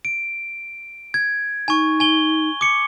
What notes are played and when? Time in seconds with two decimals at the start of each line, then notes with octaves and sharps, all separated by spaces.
0.05 D7
1.14 G#6
1.68 D#4 G#5 C#6
2.00 G#5 G7
2.61 D6 C#7